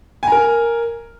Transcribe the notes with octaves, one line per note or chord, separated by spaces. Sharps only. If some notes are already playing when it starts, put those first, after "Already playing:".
A#4 G#5 A#5